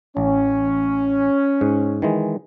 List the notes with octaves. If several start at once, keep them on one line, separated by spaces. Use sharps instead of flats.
A1 C#4
G#2
D#3 E3 G#3